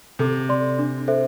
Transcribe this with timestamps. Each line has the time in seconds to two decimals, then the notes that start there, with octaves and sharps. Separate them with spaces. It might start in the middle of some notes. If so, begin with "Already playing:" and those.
0.19 C3 A4
0.49 D5 C6
0.79 D4
1.08 A4 C5 E5